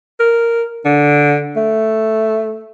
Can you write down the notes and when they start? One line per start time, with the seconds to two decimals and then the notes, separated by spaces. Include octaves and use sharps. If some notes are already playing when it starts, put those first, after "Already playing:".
0.20 A#4
0.85 D3
1.57 A3